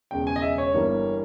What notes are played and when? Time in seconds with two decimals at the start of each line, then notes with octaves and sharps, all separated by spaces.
0.11 E1 E2 C#3 G5
0.27 G#5
0.36 D#5
0.42 E5
0.58 C#5
0.74 G1 G2 E3 G3 A#3